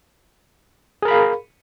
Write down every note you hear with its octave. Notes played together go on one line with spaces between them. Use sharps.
G#4 A#4 F5 B5